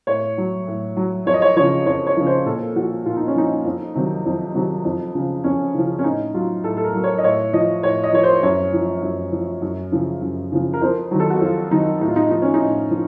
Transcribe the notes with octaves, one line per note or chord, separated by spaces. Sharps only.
A2 C#5
F#3
A2
F#3
F2 C#5
D#5
C#5
C#3 F3 C#5
F2 C#5
C#5
C#3 F3
C5
A#2 A4
F3 F#4
A#2 F4
D#4
C#4
F3 D#4
F2
C3 D#3 F#3
F2
C3 D#3 F#3
F2
C#3 F3
F2 C#4
C#3 F3
C#4
A2 D#4
F#3 F4
A2 A4
A4
A#4
F#3
C#5
D#5
A2 C#5
F3 D#5
A2 C#5
D#5
F3 C#5
C5
F#2 C#5
F3
F#2
F3
F#2
C#3 F3
F#2
C#3 F3
A#4
F2 C5
D#3 F#3
A4
F#4
F2 F4
D#3 F#3 D#4
A2 D#4
F4
D#4
F3 D#4
C#4
D#4
A2
F3